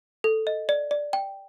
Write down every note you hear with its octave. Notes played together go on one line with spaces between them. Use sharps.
A4
D#5
D5
D5
G5